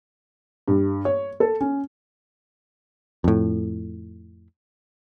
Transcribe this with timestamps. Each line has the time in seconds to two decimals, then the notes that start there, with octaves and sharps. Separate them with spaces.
0.68 G2
1.05 C#5
1.40 A4
1.61 C#4
3.24 F2 A2